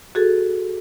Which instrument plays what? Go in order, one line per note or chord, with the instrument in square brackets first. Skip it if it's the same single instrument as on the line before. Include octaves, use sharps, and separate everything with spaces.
[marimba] F#4 G#4 A4